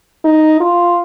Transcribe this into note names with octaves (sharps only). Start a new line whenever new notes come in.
D#4
F4